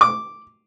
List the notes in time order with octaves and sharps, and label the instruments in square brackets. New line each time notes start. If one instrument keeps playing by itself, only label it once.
[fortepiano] D6